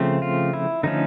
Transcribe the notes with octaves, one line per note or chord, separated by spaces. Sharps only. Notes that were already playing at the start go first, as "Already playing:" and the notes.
Already playing: C#3 F3 A3 C4
F4
E4
D3 F3 A3 C#4 D#4